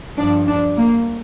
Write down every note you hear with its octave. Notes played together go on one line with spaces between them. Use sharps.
G2 F3 D4
D4
A#3